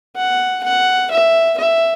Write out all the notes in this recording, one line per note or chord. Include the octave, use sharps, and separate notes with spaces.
F#5
F#5
E5
E5